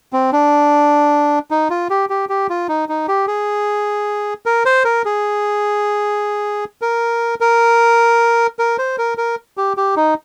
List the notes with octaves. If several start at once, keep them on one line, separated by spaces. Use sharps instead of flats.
C4
D4
D#4
F4
G4
G4
G4
F4
D#4
D#4
G4
G#4
A#4
C5
A#4
G#4
A#4
A#4
A#4
C5
A#4
A#4
G4
G4
D#4